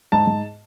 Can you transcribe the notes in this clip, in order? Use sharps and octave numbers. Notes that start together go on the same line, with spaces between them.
G#2 A5
G#2